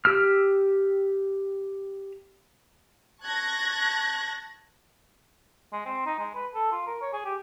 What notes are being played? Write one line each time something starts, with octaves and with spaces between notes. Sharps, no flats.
G4 E6 F6
A5 C#6 F#6 G#6 A#6
G#3
C4
D#4
G#3
B4
A4
F4
A#4
C#5
G#4
G4